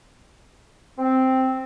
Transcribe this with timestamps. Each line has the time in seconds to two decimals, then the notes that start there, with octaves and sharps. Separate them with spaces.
0.98 C4